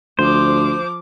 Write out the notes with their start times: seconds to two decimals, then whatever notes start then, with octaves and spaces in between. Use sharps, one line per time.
0.19 D2 F3 C5 D6